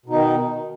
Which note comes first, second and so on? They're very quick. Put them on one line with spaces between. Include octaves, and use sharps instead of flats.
B2 D#4 D#3